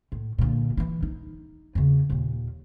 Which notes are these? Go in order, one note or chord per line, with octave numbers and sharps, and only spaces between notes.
A2
A#2 D3
E3 E4
D#4
E2 C#3
D#2 A#2